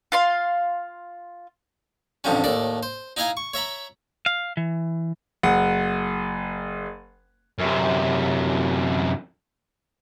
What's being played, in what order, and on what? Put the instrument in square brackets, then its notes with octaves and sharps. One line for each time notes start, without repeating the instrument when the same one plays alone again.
[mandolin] F4 F5 C6
[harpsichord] A1 D2 C3 F3 G3 C#4
D#2 A2 A4 D5
C5
D#4 E4 D#5 F5 G#5 A#5
C#6
C#5 E5 A#5 B5
[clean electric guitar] F5
E3
[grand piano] F#1 F#5
[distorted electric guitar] F#2 C3